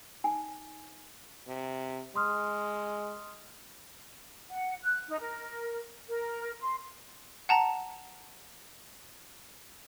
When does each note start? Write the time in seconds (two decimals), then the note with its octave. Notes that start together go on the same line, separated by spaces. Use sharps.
0.24 D#4 G#5
1.48 C3
2.16 G#3 C6 D#6 F6
4.50 F#5
4.83 F#6
5.08 D#4
5.20 A#4
6.08 A#4
6.61 C6
7.49 F#5 A5 A#5